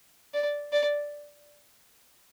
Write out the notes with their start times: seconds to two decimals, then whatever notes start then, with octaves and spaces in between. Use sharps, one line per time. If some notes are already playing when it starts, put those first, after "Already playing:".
0.34 D5
0.73 D5